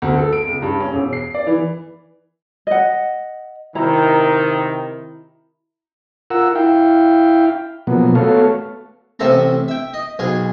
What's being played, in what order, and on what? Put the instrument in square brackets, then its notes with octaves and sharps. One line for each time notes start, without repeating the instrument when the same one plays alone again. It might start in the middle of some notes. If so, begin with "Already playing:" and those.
[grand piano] D2
A4
D7
C#2
G2
C#4
E1
C7
D5
E3
[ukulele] D#5 F#5
[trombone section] C3 D#3 [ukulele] E4 A#5
[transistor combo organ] F4 A#4 F#5 E6
E4 F5 G5
B2 F3 F#3 A#3 B3
A3 B3 F#4 A4 C#5 F5
[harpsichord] A1 C3 A4 E5 A#5
E5 G5
D#5
B1 F4 G#4